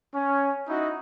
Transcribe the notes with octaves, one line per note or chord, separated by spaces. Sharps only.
C#4
D#4 E4 F#4 D#5